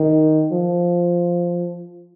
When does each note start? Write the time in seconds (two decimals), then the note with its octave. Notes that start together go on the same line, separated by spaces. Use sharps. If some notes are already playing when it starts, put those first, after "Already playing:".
Already playing: D#3
0.52 F3